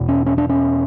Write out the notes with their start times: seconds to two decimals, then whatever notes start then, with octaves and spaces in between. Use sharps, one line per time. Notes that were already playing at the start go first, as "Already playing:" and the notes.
Already playing: E2 B2
0.09 C#4
0.26 C#4
0.38 D4
0.49 C#4